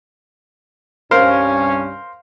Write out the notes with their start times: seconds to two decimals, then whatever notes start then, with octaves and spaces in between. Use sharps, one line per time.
1.11 C2 G2 C#4 A#4 C5 F5